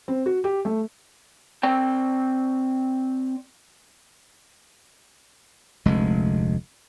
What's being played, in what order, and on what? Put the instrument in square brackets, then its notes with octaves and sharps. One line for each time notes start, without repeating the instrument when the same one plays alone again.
[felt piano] C4
F#4
G4
A3
[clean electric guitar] C4 D5 G5
[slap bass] F1 D2 G#3